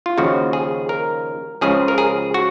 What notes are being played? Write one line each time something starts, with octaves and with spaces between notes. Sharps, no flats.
F4
D#2 C#3 F3 F#4
G#4
A#4
C#2 C#3 F3 G#4
A#4
G#4
F#4